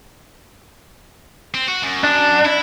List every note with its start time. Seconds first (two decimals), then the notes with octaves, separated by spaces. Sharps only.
1.55 C4
1.68 F#4
1.83 F#2
2.04 D4
2.45 E4